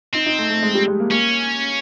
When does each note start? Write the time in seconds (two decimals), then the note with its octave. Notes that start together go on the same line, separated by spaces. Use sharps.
0.14 C4 D#4
0.26 D#4
0.39 A3
0.50 A3
0.63 G#3
0.75 G3
0.88 G#3
1.00 A#3
1.11 A#3 C#4